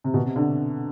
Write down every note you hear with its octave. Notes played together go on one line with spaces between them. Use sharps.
C3
B2
C3
D3